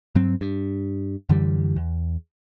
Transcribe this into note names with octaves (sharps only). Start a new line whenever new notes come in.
G2 F#3 C4
G2
F#2 D3 E3 G3
E2